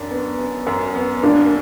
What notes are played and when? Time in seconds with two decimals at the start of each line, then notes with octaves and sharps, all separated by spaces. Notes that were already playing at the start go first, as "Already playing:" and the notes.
Already playing: F#2 D4
0.11 B3
0.39 B3
0.67 F#2
0.95 B3
1.23 A#3 D4